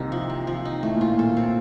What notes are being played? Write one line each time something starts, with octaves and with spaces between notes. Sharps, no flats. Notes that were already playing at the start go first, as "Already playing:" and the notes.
Already playing: C2 C3 A#3 D#4
F3
C4
F3
D#4
A2 A3
A#2
A2 F4
A#2 A4
C4